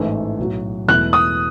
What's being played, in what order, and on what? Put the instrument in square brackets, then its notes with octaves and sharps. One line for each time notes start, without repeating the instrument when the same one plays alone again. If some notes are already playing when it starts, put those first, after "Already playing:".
Already playing: [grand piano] A1 G#2 E3 A3 D#4
B1 A2 F#3
[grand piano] E1 E2 B2 A3 E4 [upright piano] F#6
[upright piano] D#6